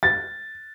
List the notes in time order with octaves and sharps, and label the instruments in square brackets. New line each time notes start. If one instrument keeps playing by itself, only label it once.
[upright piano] A6